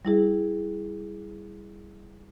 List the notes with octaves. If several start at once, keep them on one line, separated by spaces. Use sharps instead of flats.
G3 E4 G#4